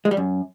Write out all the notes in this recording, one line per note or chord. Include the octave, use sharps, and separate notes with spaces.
G#3
G3
F#2